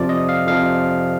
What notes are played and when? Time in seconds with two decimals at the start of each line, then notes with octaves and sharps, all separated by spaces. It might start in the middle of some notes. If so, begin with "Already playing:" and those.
Already playing: F2 C3 F3 D5
0.09 D#5
0.29 F5
0.47 F2 C3 F3 F5